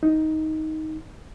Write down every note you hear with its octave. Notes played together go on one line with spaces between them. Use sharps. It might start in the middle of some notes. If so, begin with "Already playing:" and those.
D#4